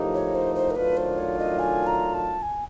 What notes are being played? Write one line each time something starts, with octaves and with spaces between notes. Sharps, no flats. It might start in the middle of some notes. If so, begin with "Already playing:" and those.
Already playing: A2 F3 A#3 D#4 G4
C#5
C5
C5
A#4
D#3 F#3 A3 D4 F4 B4
C5
C#5
D#5
G#5
A#5
A5
G#5